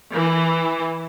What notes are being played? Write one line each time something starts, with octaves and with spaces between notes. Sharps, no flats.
E3